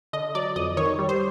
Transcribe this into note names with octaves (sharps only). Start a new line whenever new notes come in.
D3 D#5
F#3 D5
F2 D#5
D#3 C#5
G3
C5